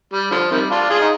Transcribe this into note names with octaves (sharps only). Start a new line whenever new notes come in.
G3
D3 F3
C3 D#3 G3
D4 F4
F4 G#4
D#4